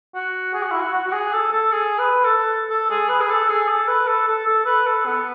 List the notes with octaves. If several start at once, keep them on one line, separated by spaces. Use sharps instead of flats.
F#4
G#4
F#4
E4
F#4
F#4
F#4
G#4
A4
A4
G#4
B4
A4
A4
G#4
B4
G#4
A4
G#4
A4
B4
A4
A4
A4
B4
A4
B3